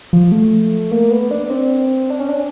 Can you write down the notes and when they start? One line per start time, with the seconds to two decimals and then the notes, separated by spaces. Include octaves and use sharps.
0.13 F3
0.32 A3
0.92 A#3
1.11 B3
1.31 D4
1.50 C4
2.10 D4
2.20 C#4
2.29 D4